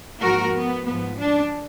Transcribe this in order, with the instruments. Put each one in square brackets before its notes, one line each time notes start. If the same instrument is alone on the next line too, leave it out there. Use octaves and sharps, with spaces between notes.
[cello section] G#2 F3 A#3 F#4 A#4
B3
G#2 F3 B3
D4